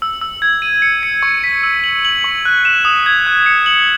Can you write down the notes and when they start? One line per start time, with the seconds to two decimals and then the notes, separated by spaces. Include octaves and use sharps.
0.02 E6
0.21 E6
0.42 G#6
0.62 D#7
0.82 C#7
1.03 C#7
1.23 C#6
1.44 B6
1.63 E6
1.84 F#7
2.05 F#7
2.24 C#6
2.45 F#6
2.65 E7
2.85 D#6
3.06 G#6
3.27 F#6
3.46 C#7
3.66 F#7